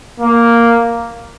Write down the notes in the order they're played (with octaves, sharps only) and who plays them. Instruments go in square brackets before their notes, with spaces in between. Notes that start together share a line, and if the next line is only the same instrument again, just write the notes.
[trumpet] A#3